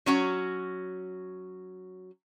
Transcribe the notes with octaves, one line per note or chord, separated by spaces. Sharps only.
F#3 C#4 F#4